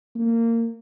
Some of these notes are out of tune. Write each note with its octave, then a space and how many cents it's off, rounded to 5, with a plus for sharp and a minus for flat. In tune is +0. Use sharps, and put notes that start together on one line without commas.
A#3 -20